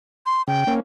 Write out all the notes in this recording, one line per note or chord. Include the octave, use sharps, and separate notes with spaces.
C6
C#3 G5
A#3 C#4